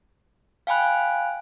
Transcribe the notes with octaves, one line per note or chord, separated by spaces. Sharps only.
F5 G5 G#5 B5 F#6